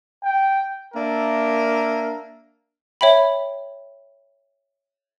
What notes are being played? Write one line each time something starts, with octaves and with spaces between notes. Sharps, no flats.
G5
A#3 D4 A#4 E5
C#5 E5 G5 B5